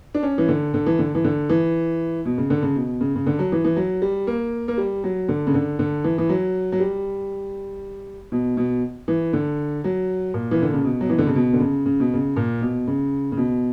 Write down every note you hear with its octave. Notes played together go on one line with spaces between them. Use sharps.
D4
C#4
E3
D3
D3
E3
D3
E3
D3
E3
B2
C#3
D3
C#3
B2
C#3
C#3
D3
F#3
E3
E3
F#3
G3
A#3
A#3
G3
F#3
D3
C#3
D3
D3
E3
E3
F#3
F#3
G3
B2
B2
E3
D3
F#3
A#2
E3
D3
C#3
B2
F#3
E3
D3
C#3
B2
D3
C#3
C#3
B2
C#3
A#2
B2
C#3
C#3
B2